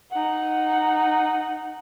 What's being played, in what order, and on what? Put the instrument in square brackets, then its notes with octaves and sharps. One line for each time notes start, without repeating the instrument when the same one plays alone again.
[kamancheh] D#4 F#5